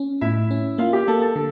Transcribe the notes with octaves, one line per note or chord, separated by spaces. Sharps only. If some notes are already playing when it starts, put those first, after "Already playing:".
Already playing: C#4
A2 E4 E5
C#4
A#3 F4 F5
G4 G5
A#3 A4 A5
A4 A5
D3 A4